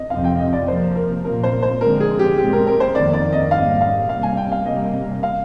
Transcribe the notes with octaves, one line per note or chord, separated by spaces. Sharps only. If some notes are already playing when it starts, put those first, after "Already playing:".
Already playing: D#5
F2 C3 F3 C4 F5
G5
D#5
D5
C3 F3 A#3 C5
A#4
A#2 F3 A#3 A#4
C5
C5
D3 F3 G#3 C4 A#4
G#4
G4
A#2 G#3 C4 G4
A#4
A#4
C5
F2 D#3 A#3 D5
D5
D#5
G#2 G3 A#3 F5
F5
C3 G3 A#3 F5
G#5
G5
F5
C3 G3 A#3 D#5
F5